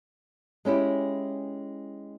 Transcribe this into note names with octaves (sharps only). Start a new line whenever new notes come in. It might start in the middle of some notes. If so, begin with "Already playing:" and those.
G#3 C#4 E4 G4